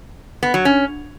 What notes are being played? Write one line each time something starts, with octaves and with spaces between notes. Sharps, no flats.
B3
F#3
C#4